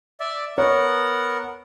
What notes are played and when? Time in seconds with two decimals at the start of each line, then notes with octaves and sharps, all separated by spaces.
0.20 D5 E5
0.58 B3 A#4 C#5 F#5